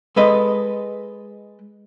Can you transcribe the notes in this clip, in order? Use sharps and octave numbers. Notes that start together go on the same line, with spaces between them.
G#3 A4 B4 D#5